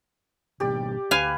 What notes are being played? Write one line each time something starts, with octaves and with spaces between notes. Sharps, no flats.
G#1 B2 G4 D5
D2 B4 F5 G#5